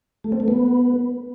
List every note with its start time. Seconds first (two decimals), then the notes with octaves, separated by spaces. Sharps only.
0.24 A3
0.32 C4
0.40 A3
0.48 B3